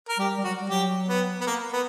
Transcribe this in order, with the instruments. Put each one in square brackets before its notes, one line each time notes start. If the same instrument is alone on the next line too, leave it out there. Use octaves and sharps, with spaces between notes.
[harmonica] A#4
[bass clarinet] G3 [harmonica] G4
[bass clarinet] G3
[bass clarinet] F#3 [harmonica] F#4
[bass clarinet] G3
[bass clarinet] F#3 [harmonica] G4
[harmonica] B3
B3
A#3
B3